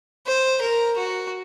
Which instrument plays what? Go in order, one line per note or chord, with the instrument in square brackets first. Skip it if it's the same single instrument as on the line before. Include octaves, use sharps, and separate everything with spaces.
[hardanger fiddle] C5
A#4
F#4